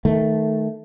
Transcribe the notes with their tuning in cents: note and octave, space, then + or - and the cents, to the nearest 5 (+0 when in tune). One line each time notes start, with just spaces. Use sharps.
D#3 +15 A3 -5